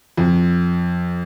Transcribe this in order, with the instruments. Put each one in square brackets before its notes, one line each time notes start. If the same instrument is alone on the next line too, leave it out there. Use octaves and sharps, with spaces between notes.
[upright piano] F2